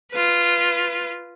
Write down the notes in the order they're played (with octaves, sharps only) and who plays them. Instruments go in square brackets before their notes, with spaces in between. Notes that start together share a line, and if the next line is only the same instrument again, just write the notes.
[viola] F4 B4